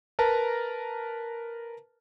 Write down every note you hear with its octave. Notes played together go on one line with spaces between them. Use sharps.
A#4 B4 A5 A#5